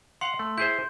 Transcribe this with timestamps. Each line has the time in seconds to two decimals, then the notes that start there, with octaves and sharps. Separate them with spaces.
0.21 F5 F#5 C6
0.39 A3
0.58 E4 G#4 C5 G6